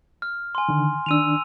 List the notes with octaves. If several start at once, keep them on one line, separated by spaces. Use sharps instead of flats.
F6
G#5 C6
D3 D#3
D#3 D4 E6 D#7 F7